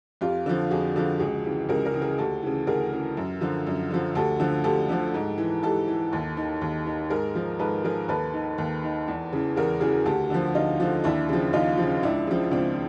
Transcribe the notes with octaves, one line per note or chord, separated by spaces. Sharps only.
F2 F4 G4
D3 F3
F2 F#4 G#4
D3 F3
C#2 F#4 G#4
C#3 E3
C#2 G#4 A#4
G#4 A#4
C#3 E3
G#4 A#4
D2 G4 A4
C#3 E3
D2 G#4 A#4
C#3 E3
F#2
D3 F3
F#2
D3 F3
D2 G4 A4
D3 F3
D2 G4 A4
D3 F3
G#2
E3
G#2 G4 A4
E3
D#2
D#3
D#2
D#3
G#2 G#4 A#4
F3
G#2 A4 B4
F3 G#4 A#4
D#2 A4 B4
D#3
D#2
D#3
E2
C#3 E3
E2 G#4 A#4
C#3 E3 F#4 G#4
D2 G4 A4
D3 F3
D2 D#4 F4
D3 F3
D#2 D4 E4
C#3 F3
D#2 D#4 F4
F3
C#3
C#2 D4 E4
C#3 F3
C#2 C4 D4